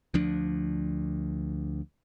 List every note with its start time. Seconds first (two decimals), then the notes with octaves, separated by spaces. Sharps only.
0.14 D2 F3 D4